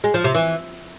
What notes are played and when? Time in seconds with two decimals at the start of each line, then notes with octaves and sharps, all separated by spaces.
0.04 G#3
0.14 F3
0.24 C3
0.35 E3